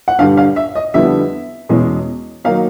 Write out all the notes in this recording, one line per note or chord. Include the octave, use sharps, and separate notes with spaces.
F#5
G2 D3 G3 F5
F5
E5
D#5
F2 D3 G3 B3 E4 E5
E2 B2 G#3 C#4
D#3 F#3 A#3 D#4 F5